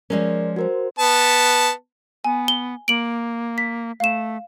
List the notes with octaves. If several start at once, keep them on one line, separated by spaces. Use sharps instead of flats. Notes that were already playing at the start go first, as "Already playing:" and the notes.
F3 G#3 C#4 A#4 D5
F#4 A#4 C5
B3 A5
B3 G#5
G7
A#3 D7 F#7
B6
A3 F5 E7